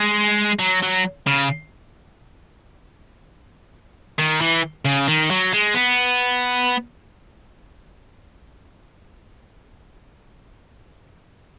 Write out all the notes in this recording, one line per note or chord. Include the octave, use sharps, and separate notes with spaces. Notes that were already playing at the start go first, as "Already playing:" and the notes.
Already playing: G#3
F#3
F#3
C#3
D#3
E3
C#3
D#3
F#3
G#3
B3